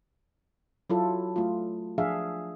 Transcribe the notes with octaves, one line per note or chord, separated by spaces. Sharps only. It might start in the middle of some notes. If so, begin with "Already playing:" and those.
F#3 E4 F4 A4
A3 F4
F3 D4 G#4 E5 F5